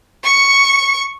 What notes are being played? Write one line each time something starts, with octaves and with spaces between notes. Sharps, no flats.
C#6 C#7